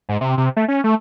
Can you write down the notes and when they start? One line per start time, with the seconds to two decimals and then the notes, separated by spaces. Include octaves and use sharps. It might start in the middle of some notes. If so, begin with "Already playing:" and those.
0.09 G#2
0.21 C3
0.38 C3
0.57 A3
0.68 C#4
0.84 A3